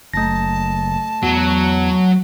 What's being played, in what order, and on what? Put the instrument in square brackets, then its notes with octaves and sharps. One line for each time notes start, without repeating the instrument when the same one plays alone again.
[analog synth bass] F#1 [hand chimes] A3 A#6 [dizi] A5
[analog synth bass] E2 [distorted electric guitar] F#3